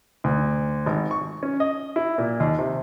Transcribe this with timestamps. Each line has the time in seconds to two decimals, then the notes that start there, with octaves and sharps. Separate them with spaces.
0.24 D2
0.86 G#1
1.11 C#6
1.43 C#4
1.60 D#5
1.96 E4
2.18 A#2
2.40 D#2
2.59 C3